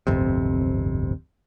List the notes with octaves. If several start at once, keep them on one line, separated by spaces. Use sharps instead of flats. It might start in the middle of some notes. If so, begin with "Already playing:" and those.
D1 G1 F2 C3